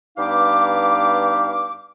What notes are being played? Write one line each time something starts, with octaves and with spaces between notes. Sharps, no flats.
G2 B3 D#4 F5 D6